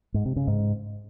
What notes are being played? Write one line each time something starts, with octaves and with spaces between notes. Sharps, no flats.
G#2
C3
C#3
G#2